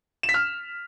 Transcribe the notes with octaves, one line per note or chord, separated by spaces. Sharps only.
E7
B6
F6